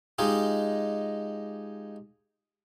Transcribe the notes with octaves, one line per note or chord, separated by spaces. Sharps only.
G#3 D#4 F4 G4 G#4